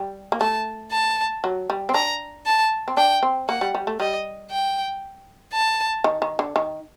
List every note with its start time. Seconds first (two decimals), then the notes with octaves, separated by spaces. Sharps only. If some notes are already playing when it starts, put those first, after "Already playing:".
Already playing: G3
0.32 A#3
0.41 A3 A5
0.92 A5
1.44 F#3
1.70 G3
1.89 C4
1.94 D4 A#5
2.46 A5
2.88 C4
2.97 D4 G5
3.23 C4
3.49 A#3 F#5
3.61 G3
3.75 G3
3.87 A3
4.00 G3 D#5
4.51 G5
5.53 A5
6.04 D#3
6.22 D#3
6.39 D3
6.56 D#3